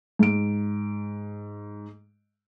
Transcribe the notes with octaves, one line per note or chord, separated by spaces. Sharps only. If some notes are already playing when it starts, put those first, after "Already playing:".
G#2 D7